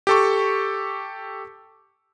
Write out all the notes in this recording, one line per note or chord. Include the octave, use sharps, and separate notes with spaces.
G4 A4 C#6